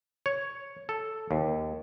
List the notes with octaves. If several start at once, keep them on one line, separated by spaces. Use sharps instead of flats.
C#5
A4
D#2